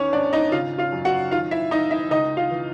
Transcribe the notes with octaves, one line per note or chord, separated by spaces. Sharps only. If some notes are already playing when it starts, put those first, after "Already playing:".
Already playing: E2 D#3 C#4 C#5
G#2 D4 D5
D#4 D#5
C#3 F4 F5
F4 F5
F#2
F#4 F#5
D#3 F4 F5
E4 E5
D#3 D#4 D#5
E4 E5
C#2 D#4 D#5
F4 F5
E3